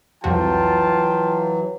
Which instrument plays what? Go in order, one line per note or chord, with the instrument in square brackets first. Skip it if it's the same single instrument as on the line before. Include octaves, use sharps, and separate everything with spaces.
[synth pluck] C2 F2 F#4 [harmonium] E3 F#3 [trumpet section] F4 G5 A5